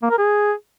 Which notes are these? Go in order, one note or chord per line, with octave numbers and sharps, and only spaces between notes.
A#3
A#4
G#4